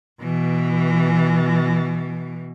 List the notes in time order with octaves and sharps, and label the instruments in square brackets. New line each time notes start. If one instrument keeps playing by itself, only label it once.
[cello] B2 E3